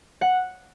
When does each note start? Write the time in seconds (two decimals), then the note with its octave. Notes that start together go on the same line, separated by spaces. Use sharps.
0.21 F#5